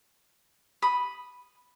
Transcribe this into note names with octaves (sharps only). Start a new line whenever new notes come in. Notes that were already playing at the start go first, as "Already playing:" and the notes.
B5 D#6